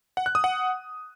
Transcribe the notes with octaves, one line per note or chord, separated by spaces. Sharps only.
F#5
F#6
D#6
F#5